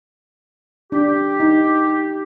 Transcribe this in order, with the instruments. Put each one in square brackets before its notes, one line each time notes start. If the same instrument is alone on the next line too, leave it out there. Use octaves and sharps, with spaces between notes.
[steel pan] D4 [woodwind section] G4
[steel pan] D#4